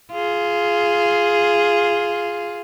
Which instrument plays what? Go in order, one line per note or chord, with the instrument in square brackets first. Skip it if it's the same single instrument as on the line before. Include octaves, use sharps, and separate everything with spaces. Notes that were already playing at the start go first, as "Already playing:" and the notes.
[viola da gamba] F4 G#4